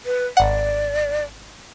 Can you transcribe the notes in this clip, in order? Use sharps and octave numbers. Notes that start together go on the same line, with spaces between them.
B4
G#1 D5 F#5